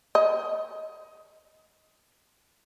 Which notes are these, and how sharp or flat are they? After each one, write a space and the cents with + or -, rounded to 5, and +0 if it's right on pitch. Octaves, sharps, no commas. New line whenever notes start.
D#5 +10